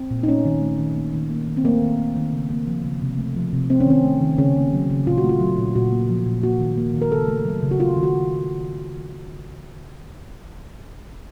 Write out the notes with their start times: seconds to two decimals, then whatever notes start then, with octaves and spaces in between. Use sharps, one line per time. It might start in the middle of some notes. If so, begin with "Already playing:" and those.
Already playing: C4
0.11 A#2
0.23 D#4
0.28 A3 C#4
0.45 D#3
0.62 A3
0.79 D#3
0.96 A#3
1.13 D#3
1.31 A#3
1.48 D#3
1.57 C4
1.64 A3 A#3
1.82 D#3
1.99 A3
2.16 D#3
2.33 C#3
2.50 A#3
2.67 F3
2.84 C#3
3.02 C3
3.18 A3
3.36 F3
3.53 C3
3.70 A3 C4
3.80 C#4
3.86 D#3 C4
4.04 A3
4.21 D#3
4.38 C#3 C#4
4.55 A#3
4.73 F#3
4.90 C#3
5.07 A#2 F4
5.18 F#4
5.24 A3
5.29 F4
5.40 F#3
5.58 A#2
5.75 A#2 F#4
5.92 A#3
6.09 F3
6.26 A#2
6.43 A#3 F#4
6.60 D#3
6.78 A#3
6.94 D#3
7.02 A#4
7.11 C#3 A4
7.28 A3
7.45 F#3
7.63 C#3
7.71 F#4
7.80 A#3 F4
7.97 D#3
8.03 F#4